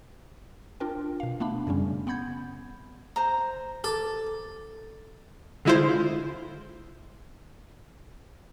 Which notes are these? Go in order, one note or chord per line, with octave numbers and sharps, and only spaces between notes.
D4 F4 A#4 G5
B2 F5
A3 B3 D4 B5
F#2 C#3 G3 C#4
B3 F#5 B5 G6 G#6
C5 A#5
A4 D6
D3 G#3 E4 F4 C5